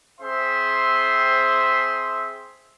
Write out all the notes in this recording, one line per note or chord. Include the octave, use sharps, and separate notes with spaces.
C4 G#4 C5 E5 C6